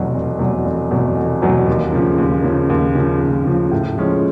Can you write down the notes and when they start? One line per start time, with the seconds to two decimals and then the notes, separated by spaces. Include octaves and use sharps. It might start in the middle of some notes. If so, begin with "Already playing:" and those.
Already playing: F1 E2 B2 F#3
0.14 F1
0.39 E2 B2 F#3
0.65 F1
0.91 E2 B2 F#3
1.17 F1
1.42 E2 B2 F#3
1.68 D#2
1.93 C#3 F3
2.18 D#2
2.44 C#3 F3
2.70 D#2
2.95 C#3 F3
3.20 D#2
3.46 C#3 F3
3.71 A2
3.97 F3 G#3 C#4